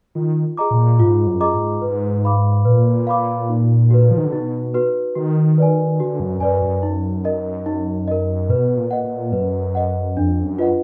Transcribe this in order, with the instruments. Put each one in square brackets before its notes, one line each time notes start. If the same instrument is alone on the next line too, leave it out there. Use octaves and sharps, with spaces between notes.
[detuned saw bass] D#3 [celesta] F4
[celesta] G#4 D#5 A#5 D6
[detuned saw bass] A#2
[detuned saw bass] G#2 [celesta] F4
[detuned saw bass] F#2
[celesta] G#4 D#5 A#5 D6
[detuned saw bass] G#2
[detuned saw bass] G#2 [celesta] B4
[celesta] F5 B5 D6
[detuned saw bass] A#2 [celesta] B4
[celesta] F5 B5 D6
D#4
F#4 B4
[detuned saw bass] F3
D#3
D3
[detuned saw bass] B2 [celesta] D#4
[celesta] F#4 B4
[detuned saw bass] D#3 [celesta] F#4
[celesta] B4 D5 G#5
[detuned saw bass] D3 [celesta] F#4
[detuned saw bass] F#2
[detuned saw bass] F#2 [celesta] B4 D5 G#5
[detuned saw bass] F#2
[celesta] D#4
A#4 D#5
D#4
A#4 D#5
[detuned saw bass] B2 [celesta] B4
[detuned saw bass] A#2
[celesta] D#5 F#5
[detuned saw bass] A#2
[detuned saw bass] F#2 [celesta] B4
[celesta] D#5 F#5
[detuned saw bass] F2 [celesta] D4
[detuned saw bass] F#2
[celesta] F4 B4 D#5 F#5